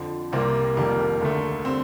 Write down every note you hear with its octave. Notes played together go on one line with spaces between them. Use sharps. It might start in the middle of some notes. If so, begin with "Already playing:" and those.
Already playing: F2 D3 F3
C2 C3 G3 A#3 C4
F1 F2 D#3 G3 A#3
D2 D3 A3
D3 G3 C4